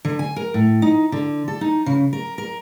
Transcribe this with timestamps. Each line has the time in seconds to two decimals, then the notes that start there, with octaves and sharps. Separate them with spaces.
0.05 D3
0.19 G#5
0.36 A#4
0.54 A2
0.82 D#4
1.12 D3
1.48 A4
1.61 D#4
1.86 C#3
2.13 A#4
2.38 A#4